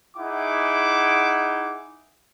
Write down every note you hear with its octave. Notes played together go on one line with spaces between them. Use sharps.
D#4 E4 G#4 F#5 D6